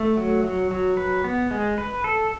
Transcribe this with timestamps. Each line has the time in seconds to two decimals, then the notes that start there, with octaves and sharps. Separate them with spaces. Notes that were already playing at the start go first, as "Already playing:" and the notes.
Already playing: A3
0.17 F#3
0.44 F#3
0.71 F#3
0.97 B4
1.24 B3
1.51 G#3
1.78 B4
2.04 A4